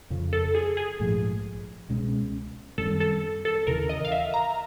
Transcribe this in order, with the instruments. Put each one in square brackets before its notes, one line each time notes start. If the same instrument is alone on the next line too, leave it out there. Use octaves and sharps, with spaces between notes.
[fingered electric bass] F2 C#3 F3
[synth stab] A4
G#4
G#4
[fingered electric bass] A#1 G#2 F3 A3
C#2 B2 G#3 C#4
[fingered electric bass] F#2 D#3 G3 C4 [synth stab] A4
[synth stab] A4
A4
[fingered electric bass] D#2 C#3 E3 [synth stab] A#4
[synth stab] D#5
F5
E5
A#5